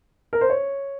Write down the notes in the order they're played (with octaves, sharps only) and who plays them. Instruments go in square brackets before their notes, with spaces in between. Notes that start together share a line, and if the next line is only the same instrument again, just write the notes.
[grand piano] A#4
C5
C#5